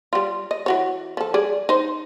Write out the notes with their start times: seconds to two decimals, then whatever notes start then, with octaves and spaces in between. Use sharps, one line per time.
0.13 G3 F4
0.51 D#5
0.66 E3 F#4 C#5
1.17 F3 A4
1.34 G3 G#4 D5
1.69 D#4 C5